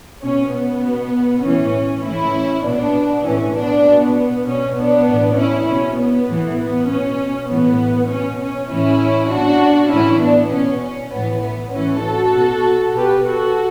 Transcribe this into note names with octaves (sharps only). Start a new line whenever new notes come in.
B2 C#4
B3
B2
A2 E3 C#4
A2 E3 C#4 E4
B2 B3 D4
A2 E3 C#4
B3 D4
B2 B3
B2 C#4
B3 D4
A2 E3
C#4 E4
B2 C#4
B3
A2 E3
B3
B2 C#4
A2 E3 B3
B2 C#4
C#4
A2 E3 C#4 E4
B2 D4 F#4
A2 E3 C#4 E4
B3 D4
B2 C#4
C#4
A2 E3 B3
B3
A2 E3 C#4
F#4 A4
B2
B2 G4 B4
F#4 A4